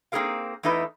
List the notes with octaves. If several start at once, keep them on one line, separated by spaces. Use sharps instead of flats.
A#3 C4 D#4 G#4 A#4 F5
E2 A3 D#4 E4 B4